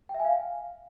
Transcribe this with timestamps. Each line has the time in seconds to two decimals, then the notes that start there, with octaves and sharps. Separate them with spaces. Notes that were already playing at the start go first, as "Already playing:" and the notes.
0.09 G5
0.14 E5
0.20 G#5
0.25 F5